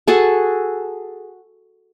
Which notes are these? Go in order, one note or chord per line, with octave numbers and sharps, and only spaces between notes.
F#4 G#4 A4